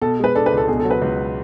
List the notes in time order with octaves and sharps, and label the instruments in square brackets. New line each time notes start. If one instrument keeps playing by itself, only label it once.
[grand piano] B2 [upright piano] A4
[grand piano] G#3 [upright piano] B4
[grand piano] D4 [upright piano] A4
[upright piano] B4
[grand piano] C#2
[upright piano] A4
[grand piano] B2 [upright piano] G#4
[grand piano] F#3 [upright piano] A4
[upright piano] B4
[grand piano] C#2